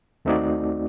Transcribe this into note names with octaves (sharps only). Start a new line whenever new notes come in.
D#2 A3 C4 D#4 F#4 D5